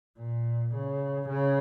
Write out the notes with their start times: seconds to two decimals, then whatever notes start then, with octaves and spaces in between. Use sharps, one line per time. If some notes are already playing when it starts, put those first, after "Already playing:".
0.19 A#2
0.74 C#3
1.29 C#3